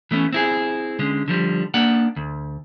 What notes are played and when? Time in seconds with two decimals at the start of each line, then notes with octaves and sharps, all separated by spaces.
0.11 E3 A3 B3 C#4
0.33 C4 E4 G#4
0.99 D3 G#3 C#4
1.28 D3 F3 G3
1.74 A#3 D4 D5 F#5
2.16 D2